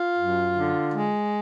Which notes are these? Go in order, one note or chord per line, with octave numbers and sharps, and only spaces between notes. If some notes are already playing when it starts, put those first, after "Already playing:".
Already playing: F4
F#2
D3
G#3